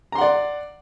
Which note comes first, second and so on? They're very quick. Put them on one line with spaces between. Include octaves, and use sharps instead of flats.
A#5 C6 F#5 D5